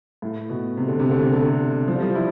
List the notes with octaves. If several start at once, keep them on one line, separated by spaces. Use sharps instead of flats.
A2
B2
C3
D3
C3
D3
C3
D3
C3
F3
G3
F3
E4